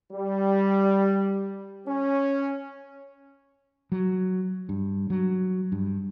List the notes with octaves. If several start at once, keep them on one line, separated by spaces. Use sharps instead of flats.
G3
C#4
F#3
G2
F#3
G2